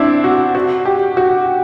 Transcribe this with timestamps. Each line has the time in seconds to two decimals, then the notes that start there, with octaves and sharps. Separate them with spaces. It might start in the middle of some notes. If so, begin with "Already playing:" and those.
Already playing: C4 D4 E4
0.24 F#4
0.55 F#4
0.85 G4
1.17 F#4